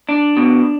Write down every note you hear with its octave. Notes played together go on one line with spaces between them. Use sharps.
D4
B2